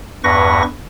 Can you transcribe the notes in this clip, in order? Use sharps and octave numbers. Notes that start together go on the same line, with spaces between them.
E2 G2 B4 C#6 A#6